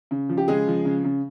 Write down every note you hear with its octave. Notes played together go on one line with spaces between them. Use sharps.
C#3
F3
G4
C#3 G#3 G#4
F3
C#3
C#3